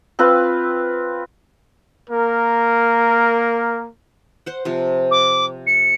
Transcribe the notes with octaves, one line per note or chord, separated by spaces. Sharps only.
C4 F4 B4
A#3 A#4
C5 F#5
C3 F3
D6
C#7